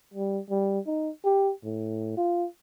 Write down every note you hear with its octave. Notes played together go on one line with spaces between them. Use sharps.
G3
G3
D#4
G4
A2
F4